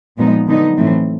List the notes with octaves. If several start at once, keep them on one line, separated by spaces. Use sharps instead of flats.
A#2 F3 G#3 B3 D#4
D3 F#3 B3 D#4
A2 E3 A3 C4